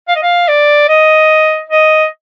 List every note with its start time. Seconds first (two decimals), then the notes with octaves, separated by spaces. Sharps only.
0.08 F5
0.16 D#5
0.22 F5
0.48 D5
0.89 D#5
1.69 D#5